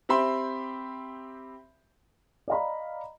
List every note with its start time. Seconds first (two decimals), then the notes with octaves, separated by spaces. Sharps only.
0.09 C4 G4 E5 B5 C6
2.48 D5 D#5 F5 A#5 B5